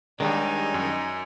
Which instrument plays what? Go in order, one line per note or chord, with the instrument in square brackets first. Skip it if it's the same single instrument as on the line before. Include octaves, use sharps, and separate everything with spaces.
[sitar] D#2 G#4 [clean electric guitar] D#3 G3 [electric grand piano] G#3 D4 [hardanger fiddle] D#4 G#5
[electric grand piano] F#2